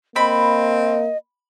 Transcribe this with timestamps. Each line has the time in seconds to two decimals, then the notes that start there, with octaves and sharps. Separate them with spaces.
0.16 A#3 C4 D#5 B5